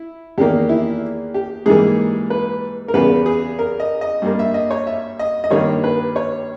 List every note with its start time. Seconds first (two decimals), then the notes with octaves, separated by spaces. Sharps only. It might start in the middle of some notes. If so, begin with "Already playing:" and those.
Already playing: E4
0.38 E2 D#3 A#3 G4
0.69 E4
1.34 G4
1.66 G#2 E3 G3 A#3 G#4
2.30 B4
2.88 A#4
2.94 E2 C#3 G3 B3 B4
3.26 G#4
3.59 A#4
3.80 D#5
4.01 D#5
4.22 G2 G3 A#3
4.39 E5
4.54 D#5
4.71 C#5
4.87 E5
5.19 D#5
5.44 D#5
5.51 G2 D#3 G3 A#3 C#5
5.84 B4
6.16 C#5